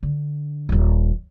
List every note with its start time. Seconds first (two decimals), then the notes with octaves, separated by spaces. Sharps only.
0.03 D3
0.69 D#1 G#1